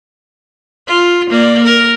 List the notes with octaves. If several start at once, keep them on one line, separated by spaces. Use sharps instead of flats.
F4
A#3 D5
A#4